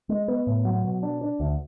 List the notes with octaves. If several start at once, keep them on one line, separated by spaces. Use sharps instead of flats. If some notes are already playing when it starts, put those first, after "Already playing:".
G#3
B3
A2
F#3
B2
D4
D4
D2